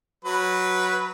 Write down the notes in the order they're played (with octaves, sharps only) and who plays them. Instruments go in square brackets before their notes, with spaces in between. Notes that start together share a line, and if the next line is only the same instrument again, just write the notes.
[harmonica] F#3 B4